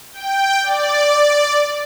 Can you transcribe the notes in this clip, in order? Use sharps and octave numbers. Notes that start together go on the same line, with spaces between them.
G5
D5